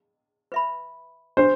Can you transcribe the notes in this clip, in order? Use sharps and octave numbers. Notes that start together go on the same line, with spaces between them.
B4 E5 B5
D4 G4 B4 C5